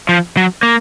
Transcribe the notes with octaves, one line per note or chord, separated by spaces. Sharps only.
F3
F#3
A#3